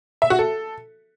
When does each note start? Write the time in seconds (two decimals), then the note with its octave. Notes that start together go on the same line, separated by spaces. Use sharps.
0.22 E5
0.30 F#4
0.39 A4